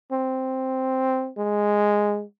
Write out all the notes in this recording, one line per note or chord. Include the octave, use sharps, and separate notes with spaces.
C4
G#3